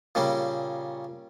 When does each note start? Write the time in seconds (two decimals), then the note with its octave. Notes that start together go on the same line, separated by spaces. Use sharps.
0.15 A#2 C#3 G3 C#4